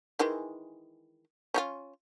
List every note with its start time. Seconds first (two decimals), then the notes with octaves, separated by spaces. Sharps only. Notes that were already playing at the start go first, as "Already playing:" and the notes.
0.19 D#3 E3 G#3
1.54 C#4 D#4 F4